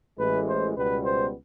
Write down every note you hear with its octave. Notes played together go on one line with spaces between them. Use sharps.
A1 A2 E3 G#3 B4
C5
C#2 B2 G3 B3 B4
C5